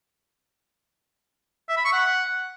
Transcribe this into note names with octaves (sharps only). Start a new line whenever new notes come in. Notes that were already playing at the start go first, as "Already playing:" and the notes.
E5
B5
C#6
F#5